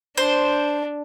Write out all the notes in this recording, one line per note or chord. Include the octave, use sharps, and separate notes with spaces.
D4 C5